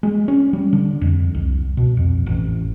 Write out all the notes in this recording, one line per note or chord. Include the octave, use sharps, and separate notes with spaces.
G#3
C#4
G3
D3
F2
C2
B2
F2
A1